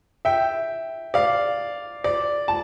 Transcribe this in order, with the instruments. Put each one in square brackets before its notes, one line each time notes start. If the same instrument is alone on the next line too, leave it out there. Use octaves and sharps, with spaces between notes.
[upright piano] E5 G5
D5 F5
D5
A5